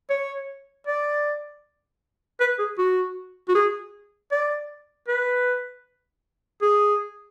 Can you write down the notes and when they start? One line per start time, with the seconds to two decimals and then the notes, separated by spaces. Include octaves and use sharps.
0.10 C#5
0.87 D5
2.40 B4
2.59 G#4
2.78 F#4
3.48 F#4
3.55 G#4
4.31 D5
5.08 B4
6.62 G#4